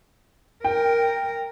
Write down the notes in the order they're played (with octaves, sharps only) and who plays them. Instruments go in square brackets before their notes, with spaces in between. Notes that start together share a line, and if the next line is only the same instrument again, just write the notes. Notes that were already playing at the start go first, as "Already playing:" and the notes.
[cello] A#4 [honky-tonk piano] G5